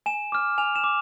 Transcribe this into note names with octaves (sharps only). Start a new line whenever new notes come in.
G#5 E7
D6 F6
G#5 F7
E7
D6